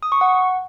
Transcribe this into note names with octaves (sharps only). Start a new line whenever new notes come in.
D#6
C#6
F#5